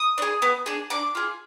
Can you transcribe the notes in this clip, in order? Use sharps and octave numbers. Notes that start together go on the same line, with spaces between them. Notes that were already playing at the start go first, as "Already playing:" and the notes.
Already playing: D#6
D4
G#4
B3
D4 G#4
D4 D6
F4 G#4